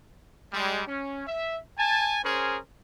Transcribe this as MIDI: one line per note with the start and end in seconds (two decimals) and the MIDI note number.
0.53 0.82 55
0.53 0.82 56
0.87 1.23 61
1.27 1.58 76
1.77 2.18 80
1.77 2.18 81
2.24 2.59 61
2.24 2.59 68
2.24 2.59 70
2.24 2.59 72